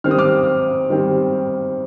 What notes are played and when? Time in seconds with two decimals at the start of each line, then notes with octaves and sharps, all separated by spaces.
0.04 D#3 G3 C4 F6
0.11 D#6
0.19 D6 F6
0.90 D#3 G3 C4